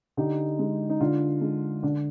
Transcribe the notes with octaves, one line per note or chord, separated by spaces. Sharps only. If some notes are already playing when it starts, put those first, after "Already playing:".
D3 D#4 G4
G#3
D#4
D3 D4 F4
G#3
D3 D4